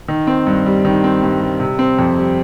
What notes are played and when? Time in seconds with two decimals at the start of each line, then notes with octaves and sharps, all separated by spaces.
0.08 D#3
0.27 C4
0.47 G2
0.66 G3
0.85 D#3
1.04 C4
1.23 G2
1.41 G3
1.60 C3
1.79 C4
1.99 F2
2.17 G3